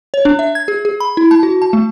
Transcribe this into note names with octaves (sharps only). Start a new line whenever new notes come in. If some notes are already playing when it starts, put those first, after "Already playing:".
C#5
D4
E5
G#6
G#4
G#4
B5
E4
A5
F#4
A5
A3